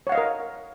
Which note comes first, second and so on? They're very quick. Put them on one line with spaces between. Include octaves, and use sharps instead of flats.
C#5 F#5 F5 D#5 A#4